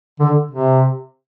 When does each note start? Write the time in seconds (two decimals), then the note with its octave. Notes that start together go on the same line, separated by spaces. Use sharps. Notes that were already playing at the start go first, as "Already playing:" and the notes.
0.20 D3
0.51 C3